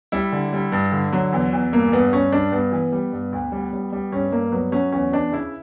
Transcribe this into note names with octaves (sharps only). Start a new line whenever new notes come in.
G3 E4
D3
G3
G2
D3
F#3
E2
E2
G2 A#3
G2 B3
G2 C#4
G2 D4
G2 B3
E3
G3
G2
D2
G3
G3
G3
G2 C#4
G2 A#3
F#3 B3
F#3 C#4
E2 C#4
E2 D4
C#3 E4